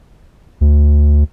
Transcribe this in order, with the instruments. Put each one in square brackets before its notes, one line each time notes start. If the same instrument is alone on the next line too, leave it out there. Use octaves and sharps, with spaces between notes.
[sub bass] D2